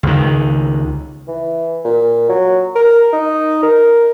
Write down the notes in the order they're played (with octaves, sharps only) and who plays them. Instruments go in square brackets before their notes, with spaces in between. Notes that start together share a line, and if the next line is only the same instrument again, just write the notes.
[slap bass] C#2 D#3
[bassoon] E3
A#2
F#3
A#4
D#4
A#4